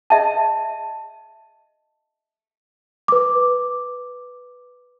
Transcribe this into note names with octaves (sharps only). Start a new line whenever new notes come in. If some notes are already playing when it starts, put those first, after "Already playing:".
D#5 E5 A5
B4 D6